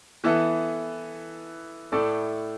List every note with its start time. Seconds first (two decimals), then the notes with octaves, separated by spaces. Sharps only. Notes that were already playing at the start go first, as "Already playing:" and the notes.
0.24 E3 B3 E4 A4
1.92 A2 A3 E4 A4 D5